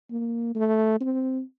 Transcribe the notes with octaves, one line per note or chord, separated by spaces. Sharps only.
A#3
A3
C4